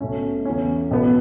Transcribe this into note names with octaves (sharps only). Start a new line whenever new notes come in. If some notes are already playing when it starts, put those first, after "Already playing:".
B1 B2 A3 C#4
E2 E3 A3 C#4
B1 B2 B3